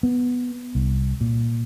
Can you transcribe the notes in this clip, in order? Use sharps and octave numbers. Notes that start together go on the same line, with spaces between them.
B3
C2
A#2